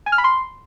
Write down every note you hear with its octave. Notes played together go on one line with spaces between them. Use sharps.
G#5
F6
B5
C6